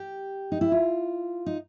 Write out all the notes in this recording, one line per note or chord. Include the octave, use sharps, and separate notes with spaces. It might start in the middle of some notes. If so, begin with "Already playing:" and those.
Already playing: G4
D#4
E4
F4
D#4